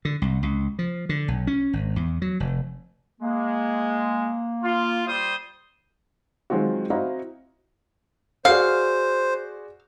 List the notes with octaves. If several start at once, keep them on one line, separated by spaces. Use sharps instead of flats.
D3
C2
C#2
F3
D3
B1
C#4
G#1
E2
F#3
F1
G#3 A#3
F4
G3 C5 D#6
D#3 F#3 G#3 C4 F4 F#4
C4 E4 F#4 D#5 F5 A#5
F#4 G#4 C5 D5 F5